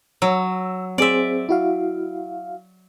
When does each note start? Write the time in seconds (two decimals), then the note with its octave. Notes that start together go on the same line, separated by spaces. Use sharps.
0.22 F#3 E6
0.98 C4 G#4 C5 D5 E5
1.49 E4 F#4 F5